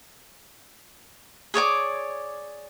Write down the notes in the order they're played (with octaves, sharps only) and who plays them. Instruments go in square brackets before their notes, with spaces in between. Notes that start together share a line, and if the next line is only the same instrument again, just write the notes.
[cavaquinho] G#4 C#5 D5 D6